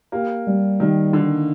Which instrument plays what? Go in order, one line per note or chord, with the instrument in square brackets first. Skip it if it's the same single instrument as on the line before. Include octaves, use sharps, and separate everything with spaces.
[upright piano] A#3 [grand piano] G4
[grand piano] G3
[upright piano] D#3 [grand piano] G3
[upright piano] D3 [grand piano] D#4